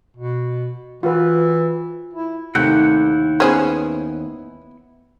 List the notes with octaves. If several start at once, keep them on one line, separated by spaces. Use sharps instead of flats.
B2
E3 F4 F#4 B4
E4
D#2 C3 A3 E4 F#5 G5
B3 C#4 G#4 B4 C5